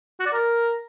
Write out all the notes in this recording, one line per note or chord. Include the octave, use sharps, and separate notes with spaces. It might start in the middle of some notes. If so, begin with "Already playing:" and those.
F#4
D5
A#4